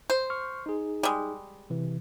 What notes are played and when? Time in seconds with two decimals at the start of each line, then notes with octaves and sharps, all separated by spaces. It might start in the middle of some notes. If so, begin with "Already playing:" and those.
0.10 C5
0.30 C#6 F6
0.66 D#4 G#4
1.03 G3 G#3
1.70 C3 E3